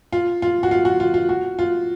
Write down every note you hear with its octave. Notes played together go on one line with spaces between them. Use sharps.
F4
F4
F#4
F4
F#4
F4
F4
F#4
F4